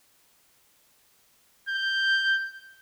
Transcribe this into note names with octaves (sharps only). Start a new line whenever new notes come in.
G6